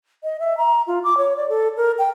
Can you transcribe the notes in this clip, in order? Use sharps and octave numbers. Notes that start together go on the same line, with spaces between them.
D#5
E5
A#5
F4
D6
C#5
D5
A4
A#4
G5